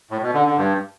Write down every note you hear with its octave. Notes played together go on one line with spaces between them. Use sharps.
A2
B2
D3
D3
G2